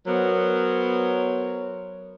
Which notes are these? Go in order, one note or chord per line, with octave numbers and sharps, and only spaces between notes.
F#3 B3 A#4 C5 C#5